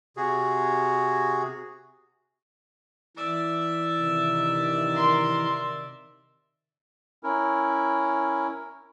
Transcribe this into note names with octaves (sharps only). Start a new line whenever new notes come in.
C3 F#4 G#4
E3 D5 E5
C3 D#3
A#4 C6
C#4 E4 A#4